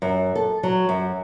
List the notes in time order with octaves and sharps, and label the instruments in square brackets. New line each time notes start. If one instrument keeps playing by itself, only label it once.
[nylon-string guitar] F#2
A4
F#3
F#2